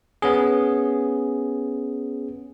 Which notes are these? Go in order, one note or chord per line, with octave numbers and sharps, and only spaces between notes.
B3 C#4 G#4